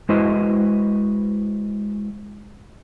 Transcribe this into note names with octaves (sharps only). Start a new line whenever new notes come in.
G#3 E4 F#4 B4 C5 D#5